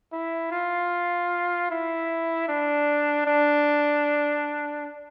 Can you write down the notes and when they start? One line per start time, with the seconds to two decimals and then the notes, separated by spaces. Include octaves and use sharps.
0.12 E4
0.51 F4
1.70 E4
2.48 D4
3.26 D4